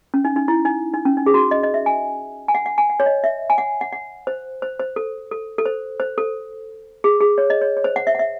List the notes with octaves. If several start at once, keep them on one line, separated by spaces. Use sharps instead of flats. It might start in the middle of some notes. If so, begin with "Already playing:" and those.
C#4
D#4
D#4
E4
D#4
D#4
C#4
D#4
G#4
F#4
D#5
D#5
E5
G#5
G#5
F#5
F#5
G#5
F#5
C#5
D#5
E5
G#5
F#5
F#5
F#5
C5
C5
C5
A4
A4
A4
C5
C5
A4
G#4
G#4
C#5
D#5
C#5
C#5
C5
F#5
E5
F#5
E5